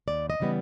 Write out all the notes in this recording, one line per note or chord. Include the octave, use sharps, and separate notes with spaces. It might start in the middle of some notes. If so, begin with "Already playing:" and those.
D#2 D5
D#5
C#3 E3 G3 B3